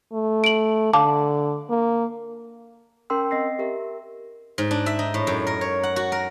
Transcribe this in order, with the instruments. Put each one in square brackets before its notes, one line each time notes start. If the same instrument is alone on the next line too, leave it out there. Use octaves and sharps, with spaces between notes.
[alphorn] A3
[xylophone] D7 F#7
[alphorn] D3 [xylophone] F5 A5 D6
[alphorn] A#3
[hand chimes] C#4 A#4 G5 C6 E6
C4 D#5 A#6 C7
G4 A#4 E5
[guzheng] G#2
D4
E5
D#4
A2
F#2
A#4
C#5
F#5
F#4
A#4